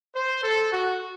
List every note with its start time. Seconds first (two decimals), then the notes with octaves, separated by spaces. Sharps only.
0.14 C5
0.43 A4
0.71 F#4